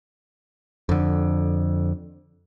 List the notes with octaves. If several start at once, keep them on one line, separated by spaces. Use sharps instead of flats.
F2 D3